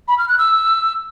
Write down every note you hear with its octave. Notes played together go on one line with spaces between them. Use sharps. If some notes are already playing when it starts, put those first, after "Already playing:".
B5
F6
F#6
E6